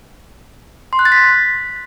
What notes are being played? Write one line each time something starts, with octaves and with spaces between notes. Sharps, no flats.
C6
F#6
A6
B6